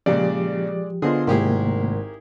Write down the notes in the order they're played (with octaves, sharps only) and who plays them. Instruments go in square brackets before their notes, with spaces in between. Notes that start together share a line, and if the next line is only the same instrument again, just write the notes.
[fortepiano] A#2 C#3 [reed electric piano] F3 G4 [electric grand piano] G#3 D5
[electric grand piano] D3 B3 F4 [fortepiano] G#4 C5 D#5
[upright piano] G#1 [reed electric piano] C3 A3 A#3 [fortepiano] E4 G4 G#4 [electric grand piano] A#4